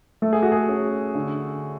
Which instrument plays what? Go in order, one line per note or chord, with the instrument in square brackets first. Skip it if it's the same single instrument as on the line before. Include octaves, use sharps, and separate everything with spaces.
[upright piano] A3 [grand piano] A4
[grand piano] G#4
F#4
G#4
[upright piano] C#4
D3